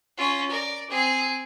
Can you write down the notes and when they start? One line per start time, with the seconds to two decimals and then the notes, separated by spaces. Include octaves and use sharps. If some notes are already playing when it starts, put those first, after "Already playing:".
0.17 C#4 F4
0.50 A#4 D5
0.90 C4 G#4